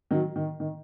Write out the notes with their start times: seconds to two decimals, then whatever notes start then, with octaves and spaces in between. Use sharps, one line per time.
0.11 D#3 F#3
0.36 D#3
0.60 D#3